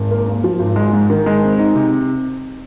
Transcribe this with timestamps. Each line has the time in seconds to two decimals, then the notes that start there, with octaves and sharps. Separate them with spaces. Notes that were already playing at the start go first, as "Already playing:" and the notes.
Already playing: G#1
0.11 A#3
0.28 D#2
0.44 F3
0.59 G#1
0.76 G#3
0.93 G#2
1.10 D#3
1.26 G#3
1.42 C4
1.59 D#4
1.75 C3